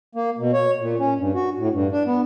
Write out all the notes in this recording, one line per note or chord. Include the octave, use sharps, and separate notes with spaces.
A#3
B2
C#5
A#2
C#4
G2
F#4
A2
G2
D4
B3